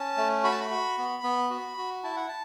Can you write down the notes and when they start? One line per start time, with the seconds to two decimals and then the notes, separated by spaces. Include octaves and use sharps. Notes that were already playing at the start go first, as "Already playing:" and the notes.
Already playing: C#4 A5
0.17 A3
0.44 F#4 B5
0.52 A5
0.60 B5
0.70 F#4
0.98 B3
1.23 B3
1.50 F#4
1.77 F#4
2.03 E4 A5
2.16 F#5
2.28 A5